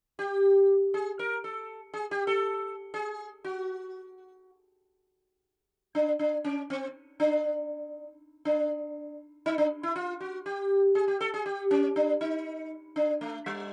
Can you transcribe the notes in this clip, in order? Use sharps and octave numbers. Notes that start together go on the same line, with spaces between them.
G4
G#4
A#4
A4
G#4
G4
A4
G#4
F#4
D4
D4
C#4
C4
D4
D4
D#4
D4
E4
F4
F#4
G4
G#4
G4
A4
G#4
G4
C#4
D4
D#4
D4
A3
G3